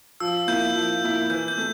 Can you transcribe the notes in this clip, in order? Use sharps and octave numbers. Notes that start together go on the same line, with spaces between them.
F3 E6
A#3 E4 G6
F3
A#3 E4
E3 G6
G6
A3